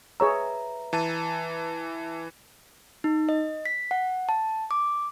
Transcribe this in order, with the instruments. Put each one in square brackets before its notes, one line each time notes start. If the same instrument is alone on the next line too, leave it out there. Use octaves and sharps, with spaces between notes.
[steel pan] G#4 C#5 E6 [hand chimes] B4 E5 A#5
[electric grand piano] E3 A5 D#7
[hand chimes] D#4
D#5
B6
F#5
A5
D6